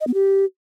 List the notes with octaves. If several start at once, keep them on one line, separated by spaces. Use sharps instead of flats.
D#5
B3
G4